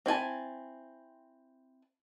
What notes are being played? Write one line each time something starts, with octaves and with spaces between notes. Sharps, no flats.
C4 E4 G#5 A5